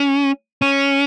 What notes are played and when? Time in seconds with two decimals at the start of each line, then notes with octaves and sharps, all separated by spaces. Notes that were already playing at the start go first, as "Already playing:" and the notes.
Already playing: C#4
0.62 C#4